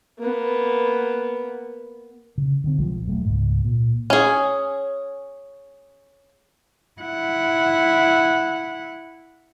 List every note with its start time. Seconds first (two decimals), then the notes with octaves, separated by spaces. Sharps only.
0.19 A#3 B3
2.38 C#3
2.64 D3 D#3 C4
2.78 B1 F3 G#3
3.06 E1 F#3 A3
3.25 C#2 G#2
3.65 A#2
4.10 C#4 G#4
7.01 E4 F#5